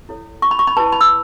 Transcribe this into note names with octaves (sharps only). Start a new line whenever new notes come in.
E4 A4 C#5
C#6
B5
C#6
B5
E4 B4 A5
B5
E6